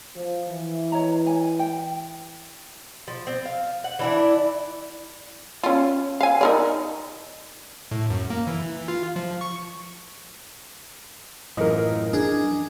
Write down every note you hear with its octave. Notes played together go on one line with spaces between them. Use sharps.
F3
E3
C#5 D#5 A#5
G#5
G5
F3
C4
F5
F#5
E3 D4 E4
C#4 F4
F5 G#5
D#4 A#4 D5
A2
F#2
A#3
E3
F4
F3
C#6
F#2 A2 E3 F3 A#4 D#5
D4 G#4